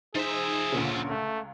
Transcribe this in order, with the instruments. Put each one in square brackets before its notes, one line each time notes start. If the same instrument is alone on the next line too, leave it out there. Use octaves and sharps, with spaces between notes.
[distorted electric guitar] F3 E5 [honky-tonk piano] D#4 C5 [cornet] G#4
[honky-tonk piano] D2 A#2 C#3
[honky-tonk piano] C#2 [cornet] A3